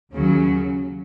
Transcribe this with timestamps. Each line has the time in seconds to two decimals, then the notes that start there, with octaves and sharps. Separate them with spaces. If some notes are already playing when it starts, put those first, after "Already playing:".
0.13 D#2 C#3 F#3